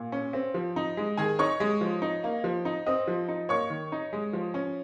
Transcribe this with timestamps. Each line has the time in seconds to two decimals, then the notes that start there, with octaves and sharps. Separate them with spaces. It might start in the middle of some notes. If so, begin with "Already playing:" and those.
Already playing: A#2
0.12 C#4
0.33 C4
0.54 F3
0.76 D#4
0.97 G#3
1.17 D#3 G#4 G#5
1.39 D#4 C#5 C#6
1.60 G#3
1.81 F3
2.02 D#4
2.24 A#3
2.44 F3
2.65 D#4
2.86 C4 D#5 D#6
3.07 F3
3.28 D#4
3.49 A#3 C#5 C#6
3.70 D#3
3.92 D#4
4.13 G#3
4.33 F3
4.54 C#4